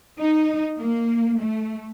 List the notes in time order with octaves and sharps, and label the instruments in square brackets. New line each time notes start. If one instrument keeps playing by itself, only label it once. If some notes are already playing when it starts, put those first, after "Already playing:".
[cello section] D#4
A#3
A3